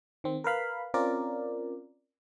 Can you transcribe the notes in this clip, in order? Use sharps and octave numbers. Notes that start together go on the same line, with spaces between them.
D#3 C4
A#4 B4 F5 B5
C4 C#4 F4 A#4 D5